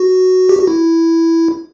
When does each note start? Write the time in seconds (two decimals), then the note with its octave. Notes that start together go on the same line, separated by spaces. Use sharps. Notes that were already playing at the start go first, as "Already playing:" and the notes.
Already playing: F#4
0.49 G4
0.59 F#4
0.67 E4